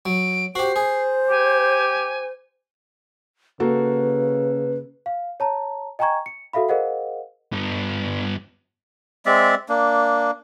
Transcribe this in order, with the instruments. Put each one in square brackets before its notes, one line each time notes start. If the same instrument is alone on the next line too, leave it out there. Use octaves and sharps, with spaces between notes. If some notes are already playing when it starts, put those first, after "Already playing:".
[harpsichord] F#3 [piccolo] D7
[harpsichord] F#4 G4 [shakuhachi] C5 [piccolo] C7
[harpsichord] G#4
[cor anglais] G4 [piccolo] G#5
[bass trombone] C#3 [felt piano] A#3 F#4 A4 [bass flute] B4
[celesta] F5
C#5 A5 A#5
D#5 G5 G#5 A#5 C#6 G#6
C#7
F#4 A4 E5 F5 B5
G#4 A#4 C5 D#5 F5 F#5
[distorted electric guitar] G2 B3
[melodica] G#3 C4 D5 E5
A#3 D4